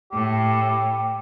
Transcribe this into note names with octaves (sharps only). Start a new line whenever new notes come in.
A2 G4